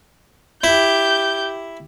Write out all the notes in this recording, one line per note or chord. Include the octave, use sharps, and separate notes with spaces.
E4 G4 E5 G6